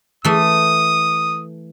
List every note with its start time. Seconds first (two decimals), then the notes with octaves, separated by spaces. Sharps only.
0.24 E3 A3 D#6